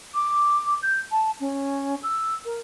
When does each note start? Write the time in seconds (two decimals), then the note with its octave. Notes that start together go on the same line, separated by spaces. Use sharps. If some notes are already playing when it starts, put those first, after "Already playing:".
0.14 D6
0.83 G6
1.12 A5
1.40 C#4
2.03 E6
2.45 A#4